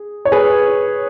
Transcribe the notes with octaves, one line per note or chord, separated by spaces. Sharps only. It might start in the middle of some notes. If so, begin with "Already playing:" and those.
Already playing: G#4
C#5
G#4 B4